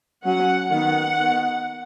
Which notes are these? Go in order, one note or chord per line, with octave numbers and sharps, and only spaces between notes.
F#3 C#4 F#5
D#3 B3 F#5
D#3 B3